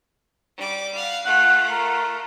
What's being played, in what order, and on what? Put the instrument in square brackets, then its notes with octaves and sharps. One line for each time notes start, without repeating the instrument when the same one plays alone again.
[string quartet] G3 D6
F5 F#5
[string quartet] A3 F4 [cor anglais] F#5
[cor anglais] A#4